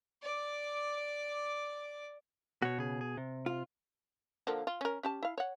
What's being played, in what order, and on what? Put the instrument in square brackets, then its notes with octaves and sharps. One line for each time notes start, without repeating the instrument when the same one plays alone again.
[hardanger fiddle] D5 D6
[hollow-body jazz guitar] B2 [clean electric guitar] F#4 C#5
[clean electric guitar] C#3 G#4
G#4
C3
[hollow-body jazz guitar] F4
[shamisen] D3 F3 A#3
F4
C#4 A#4
C#4 G4 A5
E4 F5
C#5 F#5